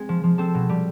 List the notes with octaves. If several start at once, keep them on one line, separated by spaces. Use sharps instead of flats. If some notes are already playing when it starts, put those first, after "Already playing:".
Already playing: G#3 C4
F3
F3
C4 A4
B2
G3